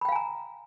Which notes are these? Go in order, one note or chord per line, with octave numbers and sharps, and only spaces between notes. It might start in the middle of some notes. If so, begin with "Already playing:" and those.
F5 G5 G#5 A#5 B5